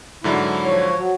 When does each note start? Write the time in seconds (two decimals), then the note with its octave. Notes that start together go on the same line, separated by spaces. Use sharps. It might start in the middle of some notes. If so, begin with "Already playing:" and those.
0.24 G#2 D3 F#3 E4
0.65 F3 C#5
0.96 F#3